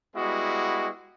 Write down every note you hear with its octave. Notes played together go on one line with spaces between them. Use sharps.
G3 G#3 B3 E4 F#4